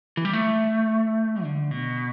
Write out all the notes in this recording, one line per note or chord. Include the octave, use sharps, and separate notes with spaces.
E3
G3
A3
D3
B2